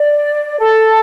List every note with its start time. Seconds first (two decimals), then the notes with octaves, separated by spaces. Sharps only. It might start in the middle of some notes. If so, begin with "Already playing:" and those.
Already playing: D5
0.59 A4